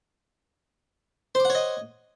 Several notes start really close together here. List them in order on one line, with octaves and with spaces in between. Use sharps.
C5 D6 F#5 C#5 D#5